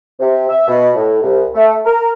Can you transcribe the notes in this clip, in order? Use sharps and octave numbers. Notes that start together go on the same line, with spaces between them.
C3
E5
B2
A2
C2
A3
A#4